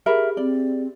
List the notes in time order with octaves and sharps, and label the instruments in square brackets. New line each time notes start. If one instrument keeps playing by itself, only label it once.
[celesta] G4 G#4 [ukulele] A#4 E5 B5
[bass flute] C4 [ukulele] D5